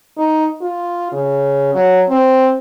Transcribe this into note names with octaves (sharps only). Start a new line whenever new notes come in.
D#4
F4
C#3
F#3
C4